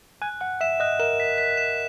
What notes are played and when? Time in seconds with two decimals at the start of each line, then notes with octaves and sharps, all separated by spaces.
0.22 G#5 F#6
0.40 F#5 F#6
0.61 E5 E7
0.80 D#5 F#6
1.00 A#4 E7
1.20 B6
1.38 B6
1.57 E7